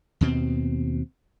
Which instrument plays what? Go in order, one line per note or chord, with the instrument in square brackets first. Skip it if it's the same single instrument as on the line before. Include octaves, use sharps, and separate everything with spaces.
[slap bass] D#2 B2 C4